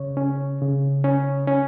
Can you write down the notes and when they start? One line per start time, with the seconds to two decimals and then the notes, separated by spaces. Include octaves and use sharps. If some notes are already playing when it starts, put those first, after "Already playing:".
Already playing: C#3 C#5
0.17 C#4
0.61 C#3
1.04 C#4
1.48 C#4